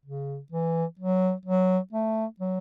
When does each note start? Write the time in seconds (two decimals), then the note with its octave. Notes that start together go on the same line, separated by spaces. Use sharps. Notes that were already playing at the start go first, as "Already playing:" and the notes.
0.05 C#3
0.52 E3
0.99 F#3
1.46 F#3
1.93 A3
2.40 F#3